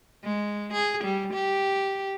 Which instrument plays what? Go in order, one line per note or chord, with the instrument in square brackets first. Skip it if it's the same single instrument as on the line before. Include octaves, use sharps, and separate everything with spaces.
[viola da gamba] G#3
G#4
G3
G4